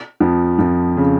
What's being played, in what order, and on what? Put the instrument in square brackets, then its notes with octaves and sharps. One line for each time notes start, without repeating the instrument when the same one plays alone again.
[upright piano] F2 F3
F2 F3
C#3